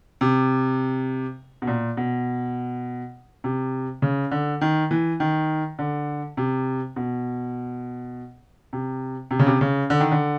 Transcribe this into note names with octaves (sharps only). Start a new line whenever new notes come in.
C3
B2
A#2
B2
C3
C#3
D3
D#3
E3
D#3
D3
C3
B2
C3
C3
C#3
C3
C#3
D3
D#3
D3